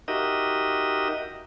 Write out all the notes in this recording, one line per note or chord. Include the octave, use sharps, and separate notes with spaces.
D#4 F#4 G4 A#4 D#5 E5